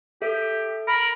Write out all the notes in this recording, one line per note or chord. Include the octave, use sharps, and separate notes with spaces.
G4 A4 E5
A#4 B5